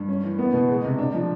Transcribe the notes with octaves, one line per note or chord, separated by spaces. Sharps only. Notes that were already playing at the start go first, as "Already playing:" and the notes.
Already playing: G2
C#4
E3
B3
B2
G#3
C3
D4
F3